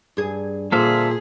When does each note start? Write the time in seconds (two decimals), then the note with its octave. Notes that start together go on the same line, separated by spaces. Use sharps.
0.17 G2 G#4
0.72 A#2 D3 F3 G#4 A4 C5 E5 F5